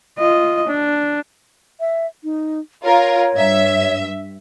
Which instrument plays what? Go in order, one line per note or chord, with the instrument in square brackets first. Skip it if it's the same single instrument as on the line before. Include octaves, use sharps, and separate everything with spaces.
[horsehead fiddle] F4 D#5
D4
[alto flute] E5
D#4
[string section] F4 A#4 [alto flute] C#5
[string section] G2 E5